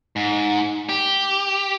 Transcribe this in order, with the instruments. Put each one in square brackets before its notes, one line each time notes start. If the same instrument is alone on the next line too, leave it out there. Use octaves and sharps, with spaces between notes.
[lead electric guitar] G#2
G4